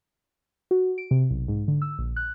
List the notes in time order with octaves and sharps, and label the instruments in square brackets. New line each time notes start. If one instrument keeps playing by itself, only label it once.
[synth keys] F#4
D7
C3
B1
G#2
D3
E6
A#1
F#6